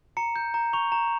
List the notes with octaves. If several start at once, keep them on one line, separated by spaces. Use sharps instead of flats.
A#5 C#7
G6
A#5
C#6 F7
A#5